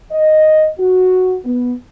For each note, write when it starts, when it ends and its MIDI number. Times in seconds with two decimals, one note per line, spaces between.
0.11 0.68 75
0.79 1.36 66
1.44 1.73 59